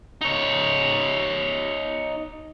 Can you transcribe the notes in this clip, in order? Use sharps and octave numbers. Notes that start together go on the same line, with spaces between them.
D#4 C#5